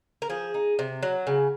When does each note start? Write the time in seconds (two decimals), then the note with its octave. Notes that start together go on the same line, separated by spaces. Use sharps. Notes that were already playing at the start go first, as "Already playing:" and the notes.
0.22 A#4
0.30 F3 G#4
0.54 D#4
0.79 C3
1.03 F#3
1.27 C#3